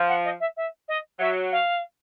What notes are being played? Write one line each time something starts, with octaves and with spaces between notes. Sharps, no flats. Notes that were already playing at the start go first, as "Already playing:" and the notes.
Already playing: F3
F#5
D#5
E5
E5
D#5
F#3 E5
F5